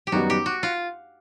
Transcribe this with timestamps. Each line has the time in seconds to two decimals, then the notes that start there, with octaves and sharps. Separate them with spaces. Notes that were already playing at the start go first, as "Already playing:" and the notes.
0.07 G4
0.12 F#2 D#3 G3 B3 D#4 F#4
0.30 G4
0.46 F#4
0.63 F4